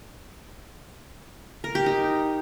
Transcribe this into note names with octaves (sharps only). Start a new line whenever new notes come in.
A#4
G4
D#4